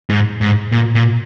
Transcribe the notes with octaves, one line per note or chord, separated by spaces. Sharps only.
G#2
G#2
A#2
A#2